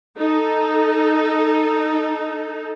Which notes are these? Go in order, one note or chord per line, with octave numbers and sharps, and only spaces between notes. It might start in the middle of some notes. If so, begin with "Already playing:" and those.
D#4 A4